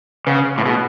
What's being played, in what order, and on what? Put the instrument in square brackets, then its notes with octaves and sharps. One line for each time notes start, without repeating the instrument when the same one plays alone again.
[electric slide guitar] C#3 [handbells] B4 F#5
[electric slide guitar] A2
[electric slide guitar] B2 [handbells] G#4